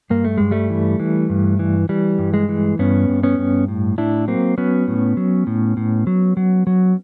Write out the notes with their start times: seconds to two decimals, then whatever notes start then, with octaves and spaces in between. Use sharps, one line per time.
0.10 G2 A#3
0.25 A3
0.38 G2 G#3
0.51 G3 A3
0.70 E3
1.00 E3
1.30 G2
1.59 E3
1.89 E3 G3
2.19 G2
2.34 G#3
2.49 E3
2.79 G2 B3 C#4
3.09 G2
3.23 B3 C#4
3.38 G2
3.68 A2
3.98 A2 D4 E4
4.28 F#3 A#3 C4
4.58 F#3 B3 C#4
4.88 A2
5.17 F#3
5.47 A2
5.77 A2
6.07 F#3
6.37 F#3
6.67 F#3